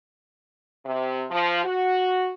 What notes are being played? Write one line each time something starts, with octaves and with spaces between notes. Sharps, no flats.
C3
F3
F#4